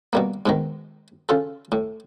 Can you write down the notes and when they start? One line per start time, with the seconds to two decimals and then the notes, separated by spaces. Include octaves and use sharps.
0.13 B2 G3 A#3
0.46 G#2 B2 D#3
1.29 C#3 F4 A4
1.72 A2